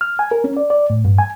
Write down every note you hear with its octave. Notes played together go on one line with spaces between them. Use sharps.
F6
G#5
A#4
C#4
D5
D5
A2
G2
G#5